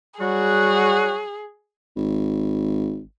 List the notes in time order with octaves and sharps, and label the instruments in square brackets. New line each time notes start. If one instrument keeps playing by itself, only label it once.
[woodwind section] F#3 G3 F#4 [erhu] G#4
[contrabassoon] G#1